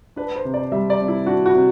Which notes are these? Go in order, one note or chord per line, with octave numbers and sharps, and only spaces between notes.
D4 B4
C5
C3
D5
G3 E5
D5
C3
E4
D4 F#4
F#4
C3